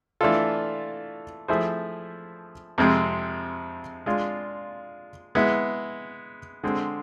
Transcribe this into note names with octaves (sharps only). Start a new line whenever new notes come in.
E3 A3 D4 F4 A4
F3 A3 E4 G#4 C5
F2 C3 G#3 C4
G#3 D4 F4
G#3 B3 E4
D3 G#3 C4